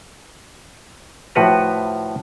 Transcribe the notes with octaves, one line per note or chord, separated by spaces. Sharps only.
A2 F3 F#4 B4 A#5